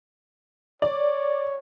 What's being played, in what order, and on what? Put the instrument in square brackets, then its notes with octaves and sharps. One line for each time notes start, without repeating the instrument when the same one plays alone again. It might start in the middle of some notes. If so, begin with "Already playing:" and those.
[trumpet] C#5 [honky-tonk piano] D5